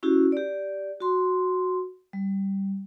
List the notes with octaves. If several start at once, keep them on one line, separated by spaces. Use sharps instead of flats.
C#4 E4 F#4 G4
G4 D5
F#4 C6
G3